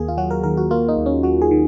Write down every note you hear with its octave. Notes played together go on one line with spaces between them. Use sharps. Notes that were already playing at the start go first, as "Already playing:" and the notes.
Already playing: D#2 A#3 G#4
F4
F#3 F#4
A#4
D#3 A#4
F#4
A#3 F4
D#4
D#2
C#4
F#3 F#4
G#4
D#3